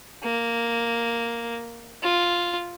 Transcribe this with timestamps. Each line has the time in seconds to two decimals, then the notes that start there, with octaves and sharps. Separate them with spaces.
0.23 A#3
2.03 F4